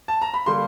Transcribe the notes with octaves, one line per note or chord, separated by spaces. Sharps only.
A5
A#5
B5
D3 G3 A#3 C6